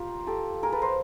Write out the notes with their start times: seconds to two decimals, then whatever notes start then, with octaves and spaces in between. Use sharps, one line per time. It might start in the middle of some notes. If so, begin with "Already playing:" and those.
Already playing: F4 G4 A#4
0.27 G4 A4
0.63 G#4 A#4
0.72 A4 B4
0.82 A#4 C5